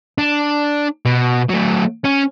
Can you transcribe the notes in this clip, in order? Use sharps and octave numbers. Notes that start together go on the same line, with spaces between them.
D4
B2
F#3 A3
C#4